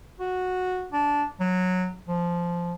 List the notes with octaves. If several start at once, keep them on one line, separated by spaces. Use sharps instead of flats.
F#4
D4
F#3
F3